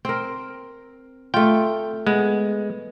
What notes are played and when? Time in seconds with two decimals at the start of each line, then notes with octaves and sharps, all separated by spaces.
0.05 C4 A#4
1.34 A3 F4 G5
2.07 G#3 B3